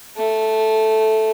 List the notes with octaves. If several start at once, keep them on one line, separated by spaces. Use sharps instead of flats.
A3